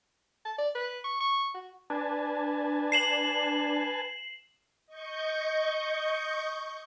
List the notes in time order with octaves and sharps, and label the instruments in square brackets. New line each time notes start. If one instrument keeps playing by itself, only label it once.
[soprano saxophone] A5
D5
B4
C#6
C#6
F#4
[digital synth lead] D4 [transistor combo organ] B4 G#5 A5
[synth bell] C7 E7 F#7
[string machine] D#5 C#6 G6